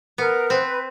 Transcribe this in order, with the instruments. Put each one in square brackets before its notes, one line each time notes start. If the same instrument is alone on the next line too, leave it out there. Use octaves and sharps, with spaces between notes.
[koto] B3 [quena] A#4
[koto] C4 [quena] B4